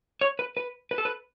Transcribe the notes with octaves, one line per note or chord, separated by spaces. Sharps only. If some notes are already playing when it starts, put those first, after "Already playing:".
C#5
B4
B4
B4
A4
B4